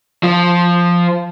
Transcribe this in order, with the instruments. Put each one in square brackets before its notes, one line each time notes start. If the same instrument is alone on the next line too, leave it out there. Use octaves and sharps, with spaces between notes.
[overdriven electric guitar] F3